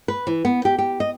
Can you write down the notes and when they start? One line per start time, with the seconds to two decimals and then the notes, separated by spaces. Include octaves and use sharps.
0.08 B4
0.27 E3
0.45 B3
0.65 G4
0.78 G4
1.00 D#5